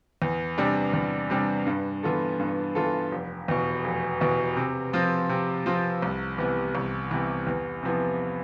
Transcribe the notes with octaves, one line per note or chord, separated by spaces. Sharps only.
E2
C3 G3 D4
E2
C3 G3 D4
G2
E3 B3 F4 A4
G2
E3 B3 F4 A4
F1
E2 B2
F1
E2 B2
C3
F3 C4 F4
C3
F3 C4 F4
C2
C3 E3 B3
C2
C3 E3 B3
E2
C3 F3 B3 E4